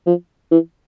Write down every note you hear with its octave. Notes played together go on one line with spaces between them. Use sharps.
F3
E3